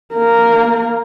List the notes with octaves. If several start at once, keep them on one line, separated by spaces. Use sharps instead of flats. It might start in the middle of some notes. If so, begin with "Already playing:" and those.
A#3 A#4